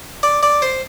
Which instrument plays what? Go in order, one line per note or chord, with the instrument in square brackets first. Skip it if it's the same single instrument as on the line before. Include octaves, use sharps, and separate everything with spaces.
[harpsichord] D5
D5
C5